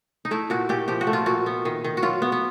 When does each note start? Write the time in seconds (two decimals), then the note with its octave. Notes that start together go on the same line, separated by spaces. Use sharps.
0.25 D#4
0.31 A3 E4
0.50 A#2 F#4
0.69 A#2 G4
0.88 F3 G4
1.01 F#4
1.07 A3
1.13 F4
1.26 A#2 F#4
1.46 B3
1.65 D#3
1.84 D#3
1.97 F#4
2.02 F#3 F4
2.22 B3
2.32 B3